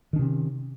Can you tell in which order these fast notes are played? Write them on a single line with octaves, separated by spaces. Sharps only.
D#3 D4 C3 C#4